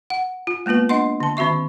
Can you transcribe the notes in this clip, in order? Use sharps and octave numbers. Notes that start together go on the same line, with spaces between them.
F#5
F4
G#3 A#3 B3 F4 B4
D4 D#5 F#5 C6
D3 A5
D#3 C4 F#4 E5 C#6